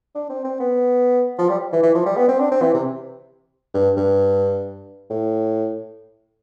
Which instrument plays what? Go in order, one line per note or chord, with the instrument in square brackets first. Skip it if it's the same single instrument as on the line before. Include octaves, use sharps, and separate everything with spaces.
[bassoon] D4
C4
C4
B3
F3
G3
E3
E3
F3
G3
B3
C4
D4
C4
E3
C3
G2
G2
A2